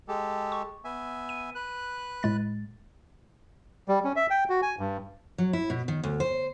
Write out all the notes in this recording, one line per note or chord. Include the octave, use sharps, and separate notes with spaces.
G#3 G4 A4
C#6
B3 E5 G#5
D#7
B4 F#6
A2 G#3 A6
G3
C#4
E5
G5
F#4
G#5
G2
F#3
E4
B2
D#3
D2
C5